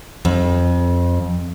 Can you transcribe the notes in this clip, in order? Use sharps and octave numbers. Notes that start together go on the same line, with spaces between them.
F2